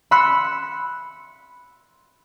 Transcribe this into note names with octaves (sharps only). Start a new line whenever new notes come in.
B5 C6 E6 F#6 B6 C#7